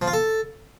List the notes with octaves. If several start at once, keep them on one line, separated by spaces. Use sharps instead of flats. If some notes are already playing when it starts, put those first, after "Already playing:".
F3
F4
A4